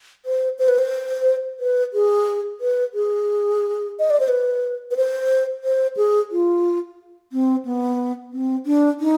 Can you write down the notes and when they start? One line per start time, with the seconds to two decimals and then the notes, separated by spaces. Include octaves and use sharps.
0.25 C5
0.59 C5
0.68 B4
0.78 C5
1.60 B4
1.93 G#4
2.61 B4
2.94 G#4
3.99 D#5
4.10 D5
4.20 C5
4.28 B4
4.91 B4
4.97 C5
5.64 C5
5.97 G#4
6.31 F4
7.32 C4
7.65 B3
8.32 C4
8.66 D4
9.00 D#4